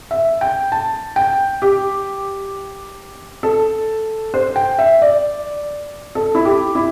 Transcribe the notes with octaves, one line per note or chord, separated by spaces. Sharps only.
E5
G5
A5
G5
G4
A4
C5
G5
E5
D5
A4
E4
G4
E4